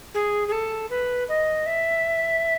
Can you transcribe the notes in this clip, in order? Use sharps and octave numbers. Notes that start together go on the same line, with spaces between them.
G#4
G#4
A4
B4
D#5
E5